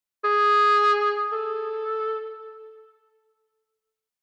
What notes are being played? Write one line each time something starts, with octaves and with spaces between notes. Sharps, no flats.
G#4
A4